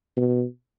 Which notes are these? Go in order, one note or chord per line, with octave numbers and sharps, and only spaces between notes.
B2